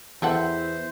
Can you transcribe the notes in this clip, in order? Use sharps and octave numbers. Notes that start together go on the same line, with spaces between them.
E2 E3 G4 A4 C5 E5 F#5